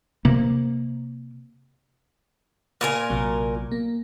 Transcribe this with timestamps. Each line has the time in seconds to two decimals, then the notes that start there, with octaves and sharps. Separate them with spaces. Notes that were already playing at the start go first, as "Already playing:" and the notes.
0.25 C3 A#3
2.81 A#2 A#4 G#5
3.10 A#1 C3 F#3
3.72 A#3